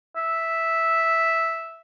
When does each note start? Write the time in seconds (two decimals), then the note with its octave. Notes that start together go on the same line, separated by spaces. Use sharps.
0.16 E5